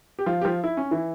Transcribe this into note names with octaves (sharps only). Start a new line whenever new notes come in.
G4
F3 F4
G4
F3 F4
E4
C#4
E3 E4